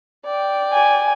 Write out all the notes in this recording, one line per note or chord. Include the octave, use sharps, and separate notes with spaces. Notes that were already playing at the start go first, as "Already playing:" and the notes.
D5 G5
G#5